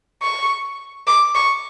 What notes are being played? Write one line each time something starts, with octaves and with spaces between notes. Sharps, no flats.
C#6
D6
C#6